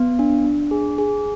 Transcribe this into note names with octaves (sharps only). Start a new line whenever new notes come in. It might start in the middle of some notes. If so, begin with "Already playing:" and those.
Already playing: B3
D4
D4
G#4
G#4